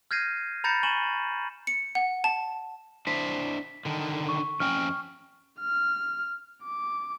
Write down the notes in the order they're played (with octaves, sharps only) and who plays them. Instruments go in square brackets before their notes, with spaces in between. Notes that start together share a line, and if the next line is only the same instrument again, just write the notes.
[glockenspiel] F6 G6 G#6 A#6 C7 D#7
A#5 B5 G6 A6 A#6 C#7
G#5 C#6 D#7 E7 F#7
[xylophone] C#7
F#5
A5
[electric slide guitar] D4 E4 C5 [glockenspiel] B6
[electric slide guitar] D3 D#3
[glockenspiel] C#6
[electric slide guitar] F2 C#4 G5 [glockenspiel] F6
[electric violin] F6
D6